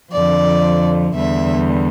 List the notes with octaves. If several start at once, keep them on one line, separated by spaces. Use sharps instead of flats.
F2 D3 F3 D5
E2 D3 G3 E5